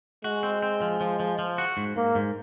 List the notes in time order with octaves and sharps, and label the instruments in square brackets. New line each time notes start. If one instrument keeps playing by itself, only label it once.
[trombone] G#3 [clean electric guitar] F#4
[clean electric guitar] C4
C4
F3
F3
F3
F3
F#4
G#2
[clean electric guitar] G#2 [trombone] A#3
[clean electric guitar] G#2